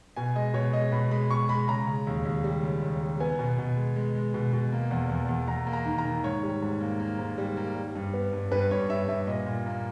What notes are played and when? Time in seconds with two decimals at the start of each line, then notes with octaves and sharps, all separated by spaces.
0.16 B2 G#5
0.36 G#3 D#5
0.54 B2 C#5
0.73 G#3 D#5
0.92 B2 B5
1.11 G#3 B5
1.30 B2 C#6
1.49 G#3 B5
1.68 C#3 A#5
1.87 C#3
2.07 D#2
2.25 D#2
2.44 G3
2.63 C#3
2.83 D#2
3.01 G3
3.20 B3 G#5
3.39 B2
3.58 B2
3.77 G#3
3.96 G#3
4.15 G#3
4.34 B2
4.53 B2
4.72 A#3
4.91 E2
5.09 E2
5.29 E2
5.47 E2 A#5
5.67 A#3
5.73 A#5
5.86 D#3
5.98 A#5
6.05 D#3
6.24 G#2 C#5
6.43 G3
6.62 G#2
6.81 A#3
7.00 A#3
7.19 G#2
7.38 G3
7.57 A#3
7.75 G3
7.95 G2
8.14 B3
8.33 G2
8.51 G2 B4
8.71 G2 C#5
8.89 G2 E5
9.08 G2 E5
9.27 A#2 D#5
9.47 A#2
9.66 A#3